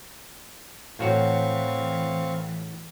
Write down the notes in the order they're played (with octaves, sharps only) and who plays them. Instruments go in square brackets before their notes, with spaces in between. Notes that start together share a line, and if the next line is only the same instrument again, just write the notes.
[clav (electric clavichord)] A2 F#4 C#5 [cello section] E3 [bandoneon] C4 F5 C#6